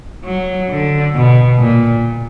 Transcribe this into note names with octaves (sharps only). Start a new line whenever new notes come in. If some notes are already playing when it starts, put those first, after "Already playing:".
F#3
D3
B2
A#2